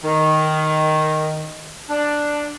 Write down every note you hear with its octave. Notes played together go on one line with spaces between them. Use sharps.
D#3
D4